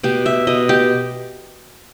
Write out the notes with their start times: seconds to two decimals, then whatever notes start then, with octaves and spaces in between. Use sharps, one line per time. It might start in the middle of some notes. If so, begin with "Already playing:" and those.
0.03 B2 G4
0.26 E5
0.47 B2 D#5
0.69 G4